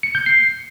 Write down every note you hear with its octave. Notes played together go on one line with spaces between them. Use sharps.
C#7
G6
C7